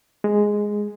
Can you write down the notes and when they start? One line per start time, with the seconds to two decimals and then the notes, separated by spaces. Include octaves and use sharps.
0.24 G#3